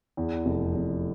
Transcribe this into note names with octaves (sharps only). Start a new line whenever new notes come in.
E2
F1
F1